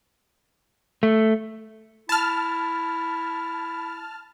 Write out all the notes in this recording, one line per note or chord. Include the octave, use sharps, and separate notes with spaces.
A3
E4 A5 F6